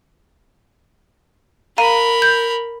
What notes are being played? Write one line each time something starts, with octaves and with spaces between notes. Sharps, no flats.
A#4 F5 A#5 B5 D#7
G6